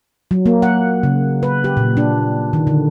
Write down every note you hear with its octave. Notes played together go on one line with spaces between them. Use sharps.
F#3
A#3
F#5
C#3
B4
G4
A#2
D4
D#3
D3